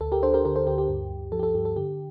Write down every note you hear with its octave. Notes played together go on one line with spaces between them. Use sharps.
D2 A4
G4 A#4
D4 A4 C5
G4 A#4
D3 G4 A#4
A4 C5
D2 G4 A#4
G4
G2
G2
F3 A4
G4
A4
G2 G4
A4
D3 G4